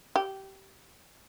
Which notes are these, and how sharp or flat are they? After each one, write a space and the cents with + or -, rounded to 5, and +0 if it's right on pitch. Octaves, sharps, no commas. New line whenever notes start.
G4 -20